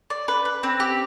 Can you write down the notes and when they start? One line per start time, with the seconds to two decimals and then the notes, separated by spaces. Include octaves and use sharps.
0.10 D5
0.28 B4
0.45 B4
0.63 C4
0.80 G4